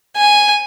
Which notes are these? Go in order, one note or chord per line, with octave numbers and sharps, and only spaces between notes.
G#5